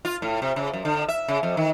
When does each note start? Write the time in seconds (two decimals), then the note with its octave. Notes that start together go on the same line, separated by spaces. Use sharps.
0.05 F4
0.22 A2
0.42 C3
0.56 C#3
0.73 F#2
0.85 D3
1.08 E5
1.28 C#3
1.43 F2
1.57 D#3